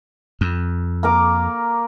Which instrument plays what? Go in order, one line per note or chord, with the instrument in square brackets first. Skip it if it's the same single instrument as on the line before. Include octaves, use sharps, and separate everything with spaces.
[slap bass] F2
[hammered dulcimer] A#3 A#4 D6